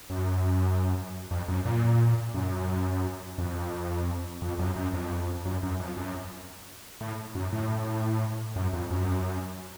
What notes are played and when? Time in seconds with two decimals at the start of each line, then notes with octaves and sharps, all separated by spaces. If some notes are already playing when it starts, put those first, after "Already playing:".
0.10 F#2
1.31 F2
1.48 F#2
1.65 A#2
2.34 F#2
3.38 F2
4.42 F2
4.59 F#2
4.76 F#2
4.93 F2
5.45 F#2
5.63 F#2
5.80 F2
5.97 F#2
7.01 A2
7.35 F#2
7.52 A2
8.56 F#2
8.73 F2
8.90 F#2